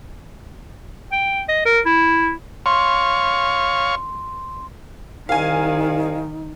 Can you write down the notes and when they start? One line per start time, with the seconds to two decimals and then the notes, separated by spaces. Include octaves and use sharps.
1.12 G5
1.48 D#5
1.65 A#4
1.85 E4
2.66 C#5 F5 C6 C#6
5.29 C2 D#3 D#4 F5 G#5